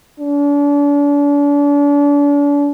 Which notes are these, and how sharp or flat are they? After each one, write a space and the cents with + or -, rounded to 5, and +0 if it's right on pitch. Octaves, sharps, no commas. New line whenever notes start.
D4 -40